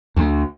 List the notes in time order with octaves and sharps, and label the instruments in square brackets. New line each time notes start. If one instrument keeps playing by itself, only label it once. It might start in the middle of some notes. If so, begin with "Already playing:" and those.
[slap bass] D2